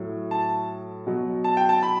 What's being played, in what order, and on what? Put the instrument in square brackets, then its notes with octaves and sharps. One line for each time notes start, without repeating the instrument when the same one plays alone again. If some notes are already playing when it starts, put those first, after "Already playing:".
Already playing: [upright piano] A2 F#3
A5
B2 F#3
A5
G5
A5
B5